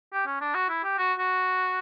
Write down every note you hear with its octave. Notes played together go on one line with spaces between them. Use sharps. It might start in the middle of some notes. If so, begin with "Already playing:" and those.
G4
C#4
D4
F#4
E4
G4
F#4
F#4